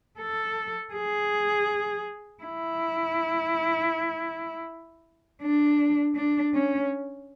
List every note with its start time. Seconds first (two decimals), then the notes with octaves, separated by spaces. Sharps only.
0.19 A4
0.94 G#4
2.44 E4
5.42 D4
6.16 D4
6.54 C#4